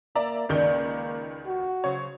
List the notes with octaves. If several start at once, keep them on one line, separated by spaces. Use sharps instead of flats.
A#3 D5 E5 A#5
C#2 D#3 A#3 D5 G6
F#4
C#3 F#3 C5 C#5